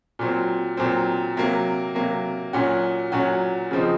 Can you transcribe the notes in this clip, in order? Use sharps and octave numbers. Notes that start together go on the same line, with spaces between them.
A#2 F#3 C4
A#2 F#3 C4
C3 F#3 A#3
C3 F#3 A#3
A#2 F#3 C#4 F#4
A#2 F#3 C#4 F#4
C#3 F3 C4 D#4